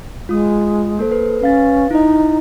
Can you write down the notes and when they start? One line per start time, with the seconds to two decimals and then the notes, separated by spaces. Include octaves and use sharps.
0.29 G#3 F4 D#6
0.99 A#3 A4 C5
1.12 B4
1.42 C#4 B4 F5 A6
1.91 D#4 E4 D#5